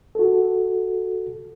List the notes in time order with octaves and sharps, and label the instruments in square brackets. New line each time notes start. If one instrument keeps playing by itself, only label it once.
[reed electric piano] F#4 A4